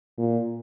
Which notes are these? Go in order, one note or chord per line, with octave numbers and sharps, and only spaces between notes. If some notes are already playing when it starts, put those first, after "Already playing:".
A#2